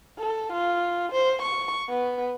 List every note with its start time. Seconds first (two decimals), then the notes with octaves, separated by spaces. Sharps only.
0.19 A4
0.53 F4
1.13 C5
1.42 C#6
1.89 B3